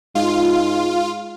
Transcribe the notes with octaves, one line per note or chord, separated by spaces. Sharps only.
G#2 F4